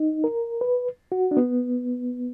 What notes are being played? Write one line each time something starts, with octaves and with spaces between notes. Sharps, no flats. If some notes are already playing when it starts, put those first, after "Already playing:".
Already playing: D#4
A#4
B4
F#4
D4
B3